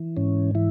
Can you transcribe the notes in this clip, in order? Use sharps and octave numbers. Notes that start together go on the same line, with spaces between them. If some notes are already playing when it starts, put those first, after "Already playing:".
Already playing: E3
G#2 C#4
E3 E4